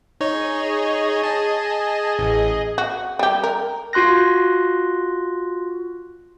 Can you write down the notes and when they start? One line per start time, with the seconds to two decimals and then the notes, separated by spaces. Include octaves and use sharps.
0.21 D#4 G#4 C#5 D#5
1.23 G#5 A5
2.19 A1
2.78 F#4
3.19 G3 G4
3.43 A#4
3.93 F4 F#4 C6 F#6 A#6